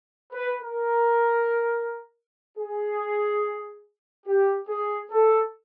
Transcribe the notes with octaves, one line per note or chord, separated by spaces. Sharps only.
B4
A#4
G#4
G4
G#4
A4